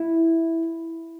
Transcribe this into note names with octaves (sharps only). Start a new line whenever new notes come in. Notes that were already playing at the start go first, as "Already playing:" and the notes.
Already playing: E4